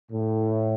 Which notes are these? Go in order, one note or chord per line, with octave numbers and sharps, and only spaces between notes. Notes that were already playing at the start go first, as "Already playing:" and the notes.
A2